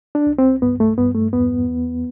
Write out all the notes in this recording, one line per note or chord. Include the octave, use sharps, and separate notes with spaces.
D4
C2
C4
G2 B3
A3
G2 B3
A3
E2 B3
E2